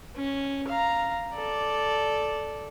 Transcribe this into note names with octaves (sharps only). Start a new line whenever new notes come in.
C#4
F5 A#5
A4 D5